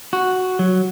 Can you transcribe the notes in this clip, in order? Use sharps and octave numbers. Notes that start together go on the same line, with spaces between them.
F#4
F#3